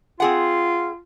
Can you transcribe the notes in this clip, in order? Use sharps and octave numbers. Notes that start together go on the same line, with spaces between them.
C4 F4 G#4 F#5